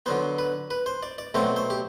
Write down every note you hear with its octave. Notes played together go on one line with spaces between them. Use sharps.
D3 F#3 B3 C5
B4
B4
C5
D5
D5
B2 F#3 A3 C4 C5
C5
G4